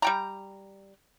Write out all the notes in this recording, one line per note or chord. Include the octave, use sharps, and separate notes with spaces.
G3 G5 A#5